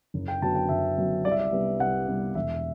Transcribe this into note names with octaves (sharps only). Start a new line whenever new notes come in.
F#1
G5
F#2 D3 F#3 B3 A5
G5
F#1 E5
F#2 D3 F#3 B3
C2 D5
E5
D5
C3 G3 B3
C2 F#5
C3 G3 B3
E1 E5